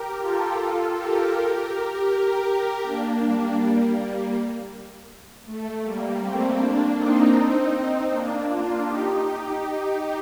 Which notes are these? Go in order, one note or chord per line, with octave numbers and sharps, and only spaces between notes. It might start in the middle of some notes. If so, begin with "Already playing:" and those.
Already playing: G4 A#4
F4 A4
F4 A4
G4 A#4
G4 A#4
G4 A#4
A#3 D4
G3 A#3
A3
G3 A#3
A3 C4
A#3 D4
C4 D#4
A#3 D4
D4 F4
D#4 G4